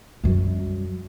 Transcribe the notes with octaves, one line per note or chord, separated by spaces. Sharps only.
F#2 G3